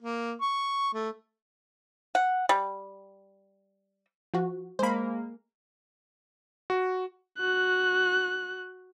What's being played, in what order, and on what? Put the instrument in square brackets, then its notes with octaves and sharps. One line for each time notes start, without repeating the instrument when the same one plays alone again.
[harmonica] A#3
C#6
A3
[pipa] F#5
G3
[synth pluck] F3 F#4
[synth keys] G#3 A#3 [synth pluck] C5 B5
[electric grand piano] F#4
[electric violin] F#4 F#6